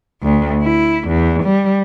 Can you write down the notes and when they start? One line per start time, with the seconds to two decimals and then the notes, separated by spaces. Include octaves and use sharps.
0.23 D2
0.63 E4
1.08 E2
1.43 G3